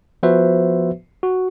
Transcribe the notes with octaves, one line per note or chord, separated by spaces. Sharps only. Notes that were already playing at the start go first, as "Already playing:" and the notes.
F3 B3 F#4 B4 C5 E5
F#4